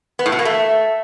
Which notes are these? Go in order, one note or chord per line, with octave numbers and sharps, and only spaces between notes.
B3
A2
B2
A#3
A3